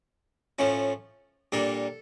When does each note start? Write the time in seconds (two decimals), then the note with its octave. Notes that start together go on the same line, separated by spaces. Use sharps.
0.59 A2 F3 C#4 E4
1.52 A#2 G3 A#3 D4 A4